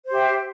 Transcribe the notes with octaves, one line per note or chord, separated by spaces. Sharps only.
G4 C5 E5